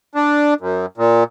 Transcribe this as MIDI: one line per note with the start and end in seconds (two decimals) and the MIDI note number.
0.15 0.54 62
0.61 0.86 42
0.97 1.24 46